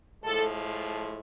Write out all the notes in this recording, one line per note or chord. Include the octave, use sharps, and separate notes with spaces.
A2 F3 G#3 A4